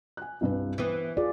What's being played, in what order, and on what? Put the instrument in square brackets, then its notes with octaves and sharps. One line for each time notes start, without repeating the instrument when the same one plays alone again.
[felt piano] G#5 F#6
C2 G2 B4
[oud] E3 B3 [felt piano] B4
[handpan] F4 G#4 D5